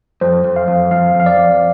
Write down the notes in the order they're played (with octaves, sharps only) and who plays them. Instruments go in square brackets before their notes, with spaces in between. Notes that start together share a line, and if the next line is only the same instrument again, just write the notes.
[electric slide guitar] F2 [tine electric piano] C5
[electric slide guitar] F2
[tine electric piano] F5
[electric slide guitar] F2
[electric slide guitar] F2 [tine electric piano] F5
[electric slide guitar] F2
[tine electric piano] F5
D5
[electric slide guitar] F2